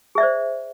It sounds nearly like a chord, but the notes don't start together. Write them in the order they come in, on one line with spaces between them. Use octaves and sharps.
G#4 E5 D5 C5